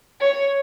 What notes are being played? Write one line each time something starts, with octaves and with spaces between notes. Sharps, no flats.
C#5